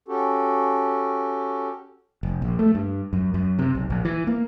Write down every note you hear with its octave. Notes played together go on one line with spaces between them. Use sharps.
C#4 F#4 G4 A4
F1
A#1
A3
G2
F#2
F#2
C3
B1
A#1
E3
A#3